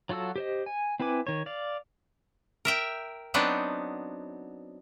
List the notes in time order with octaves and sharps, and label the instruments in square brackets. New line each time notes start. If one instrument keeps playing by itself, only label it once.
[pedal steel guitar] F#3 F4 F#4 A4 E6
G4 C5 D#5
G#5
C4 E4 B4 G#5 D6
D#3 C#5
D5 F5
[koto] A#4 E5 G5
F#3 B3 C4 D4 D#4